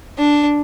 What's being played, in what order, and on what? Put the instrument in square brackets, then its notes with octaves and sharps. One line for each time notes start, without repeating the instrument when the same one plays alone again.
[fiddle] D4